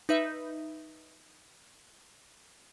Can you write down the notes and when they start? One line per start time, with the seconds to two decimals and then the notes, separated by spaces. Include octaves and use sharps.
0.09 D#4 B4 E5